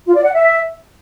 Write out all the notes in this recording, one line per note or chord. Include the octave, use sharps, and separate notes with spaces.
F4
D5
F#5
E5